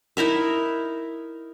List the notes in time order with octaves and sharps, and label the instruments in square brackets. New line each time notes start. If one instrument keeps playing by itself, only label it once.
[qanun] D#4 E4 A#4 E5